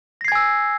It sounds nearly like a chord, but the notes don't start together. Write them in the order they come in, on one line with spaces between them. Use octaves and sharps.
A#6 C7 G#6 G#5 E6